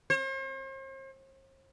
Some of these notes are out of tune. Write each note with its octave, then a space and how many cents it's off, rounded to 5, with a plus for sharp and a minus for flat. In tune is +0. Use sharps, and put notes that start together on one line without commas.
C5 +45